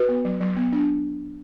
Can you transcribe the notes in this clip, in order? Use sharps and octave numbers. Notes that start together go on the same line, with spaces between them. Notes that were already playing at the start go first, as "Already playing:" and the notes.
Already playing: F#4 B4
B3
F#3
F#3
B3
D4